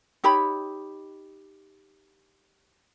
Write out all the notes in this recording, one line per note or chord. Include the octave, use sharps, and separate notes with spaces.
D#4 G4 C#5 B5